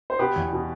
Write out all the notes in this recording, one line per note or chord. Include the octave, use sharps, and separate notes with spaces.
C5
B2 G4 B4
E2
B2